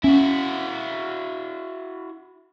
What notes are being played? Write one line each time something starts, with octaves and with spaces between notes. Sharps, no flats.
C#4 E4 F#4